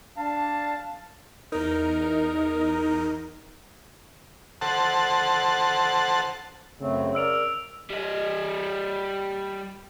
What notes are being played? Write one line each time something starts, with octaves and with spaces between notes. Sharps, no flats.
D4 F5 A5
E2 D#4 A#4
A4 C5 F#5 A5
F#2 C#3 A3 C4
A#4 D5 E6 D7 F7
G3 D#5